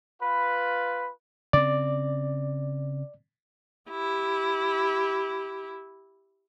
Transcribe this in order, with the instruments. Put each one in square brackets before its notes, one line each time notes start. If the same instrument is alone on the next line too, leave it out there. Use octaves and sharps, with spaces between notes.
[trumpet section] F4 B4
[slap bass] C#3 C4 [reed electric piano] D5
[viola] E4 G4